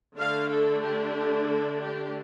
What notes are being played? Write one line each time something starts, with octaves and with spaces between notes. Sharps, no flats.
D3 A3 D4 F5
A4
G4
A4
G4